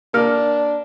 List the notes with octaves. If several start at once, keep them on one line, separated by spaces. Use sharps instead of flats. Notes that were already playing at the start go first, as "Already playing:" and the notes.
A#3 D4 F6